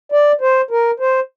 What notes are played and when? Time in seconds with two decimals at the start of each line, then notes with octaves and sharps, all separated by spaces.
0.12 D5
0.41 C5
0.71 A#4
1.00 C5